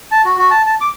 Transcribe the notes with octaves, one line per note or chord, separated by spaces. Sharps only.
A5
F#4
F#4
A5
A5
D6